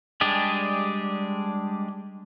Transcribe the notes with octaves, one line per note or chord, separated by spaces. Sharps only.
G3 G#3 D4 G4 G#4